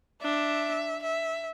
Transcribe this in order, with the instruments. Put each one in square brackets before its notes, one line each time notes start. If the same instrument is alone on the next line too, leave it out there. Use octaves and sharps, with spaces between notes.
[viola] D4 [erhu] E5
[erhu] E5